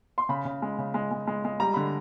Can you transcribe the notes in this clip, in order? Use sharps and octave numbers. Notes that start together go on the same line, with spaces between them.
C6
C#3 B5
C#3
G#3
C#3
G#3
G#3
G#3
G#3
G3 A#5
D3 B5